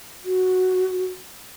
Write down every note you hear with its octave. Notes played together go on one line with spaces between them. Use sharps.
F#4